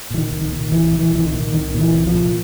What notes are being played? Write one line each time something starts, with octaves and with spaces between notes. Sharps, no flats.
A#2 E3
D#3
C2
D#3
A#2
C2 E3
A#2
E3
C2 E3
D#3
A#2
C2 D#3
A#2
E3
C2
F3
A#2